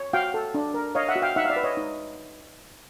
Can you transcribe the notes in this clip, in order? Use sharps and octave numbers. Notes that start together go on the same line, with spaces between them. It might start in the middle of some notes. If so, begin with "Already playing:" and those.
Already playing: C#5
F#4 F5 G5
A4
D4
A#4
C#5 D#5 F5
E5 F#5
F#4
F5 G5
D#4 E5 F#5
F5
D5 E5
B4
C#5 D#5
D#4